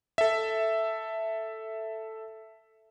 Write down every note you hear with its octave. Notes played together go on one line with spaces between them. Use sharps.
A4 E5